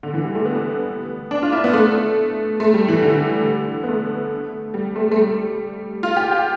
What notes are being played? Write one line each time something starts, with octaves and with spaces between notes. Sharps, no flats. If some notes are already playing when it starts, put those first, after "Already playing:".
D3
E3
G3
A3
B3
D4
F4
E4
B3
A3
A3
G3
E3
D3
B3
A3
G3
A3
A3
G3
F4
G4
G4